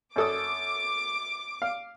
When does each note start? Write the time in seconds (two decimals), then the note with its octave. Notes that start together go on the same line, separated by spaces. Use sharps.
0.16 F#2 A4 D6 D#6
1.62 F5